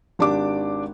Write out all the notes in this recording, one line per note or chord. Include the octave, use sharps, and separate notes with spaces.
G#1 D4 G4 D6